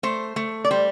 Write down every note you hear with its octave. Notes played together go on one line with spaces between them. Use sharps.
A3 C5
A3
D5
G3 C5